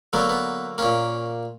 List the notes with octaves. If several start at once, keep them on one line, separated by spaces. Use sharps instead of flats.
D3 F#3 A#3 B3
B3
A#2 A#3 C#4